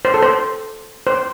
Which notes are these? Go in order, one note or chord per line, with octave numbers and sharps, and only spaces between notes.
C5
A4
C5
C5